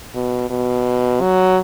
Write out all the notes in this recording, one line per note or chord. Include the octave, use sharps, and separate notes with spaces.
B2
B2
F#3